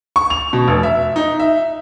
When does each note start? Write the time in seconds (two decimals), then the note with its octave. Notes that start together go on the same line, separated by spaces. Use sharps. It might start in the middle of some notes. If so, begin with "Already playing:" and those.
0.16 C#6
0.30 F7
0.53 B2
0.68 F1
0.83 E5
1.16 D#4
1.40 E5